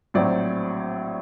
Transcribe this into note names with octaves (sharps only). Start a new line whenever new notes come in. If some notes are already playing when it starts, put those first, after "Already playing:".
A#1 A2 F#3 C4 D5